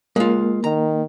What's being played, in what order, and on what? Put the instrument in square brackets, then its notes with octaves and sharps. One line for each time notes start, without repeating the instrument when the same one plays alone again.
[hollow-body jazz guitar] G#3 F4 [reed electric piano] A#3
[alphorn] D#3 [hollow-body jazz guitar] A#5